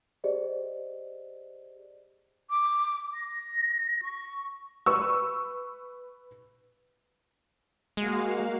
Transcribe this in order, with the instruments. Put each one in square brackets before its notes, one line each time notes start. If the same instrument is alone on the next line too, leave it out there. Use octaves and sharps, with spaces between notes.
[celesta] G4 G#4 C5 D5 D#5
[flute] D6
A#6
C#6
[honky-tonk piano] B4 C#6 E6
[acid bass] G#3 [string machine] A#3 F#4 F5